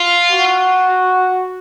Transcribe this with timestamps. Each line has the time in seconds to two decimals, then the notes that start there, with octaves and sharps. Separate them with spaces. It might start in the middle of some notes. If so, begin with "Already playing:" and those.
Already playing: F4
0.31 F#4